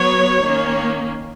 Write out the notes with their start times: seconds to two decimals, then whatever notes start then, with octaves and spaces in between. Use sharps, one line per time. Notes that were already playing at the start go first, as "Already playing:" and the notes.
Already playing: F#3 B3 C#5
0.41 D#3 A#3 C#4